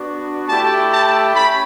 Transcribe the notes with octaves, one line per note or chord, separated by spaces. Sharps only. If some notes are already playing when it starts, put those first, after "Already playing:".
Already playing: B3 D4 F#4
A3 E4 G4 A5
A5
C#4 B5